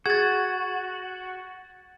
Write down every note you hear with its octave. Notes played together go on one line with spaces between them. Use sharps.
F#4 G#4 G#6 A6